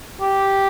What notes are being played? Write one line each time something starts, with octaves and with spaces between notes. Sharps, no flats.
G4